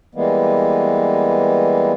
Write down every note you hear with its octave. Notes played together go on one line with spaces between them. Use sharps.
E3 G3 G#3 A#3 B3